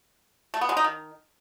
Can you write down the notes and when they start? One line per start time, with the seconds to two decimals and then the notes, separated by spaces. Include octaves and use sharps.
0.54 A3
0.61 B3
0.69 G#3
0.77 D#4
0.84 D#3